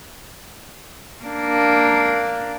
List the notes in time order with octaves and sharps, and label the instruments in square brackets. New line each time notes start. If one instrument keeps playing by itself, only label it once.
[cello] A#3 D4